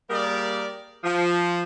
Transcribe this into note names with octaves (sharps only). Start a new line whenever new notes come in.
G3 A#3 G#4 A#4 D5
F3